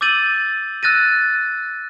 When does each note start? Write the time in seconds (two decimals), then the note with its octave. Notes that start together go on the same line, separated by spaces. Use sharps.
0.01 D6 E6 G6 A6 D#7 F#7
0.83 E6 F#6 A6 A#6 D#7